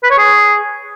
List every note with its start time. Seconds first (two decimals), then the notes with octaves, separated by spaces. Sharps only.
0.03 B4
0.10 C#5
0.18 G#4